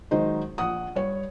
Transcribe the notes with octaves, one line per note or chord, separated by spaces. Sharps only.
D#3 F#3 G#3 D#4 C5
A#1 F#5 D#6
G2 C#5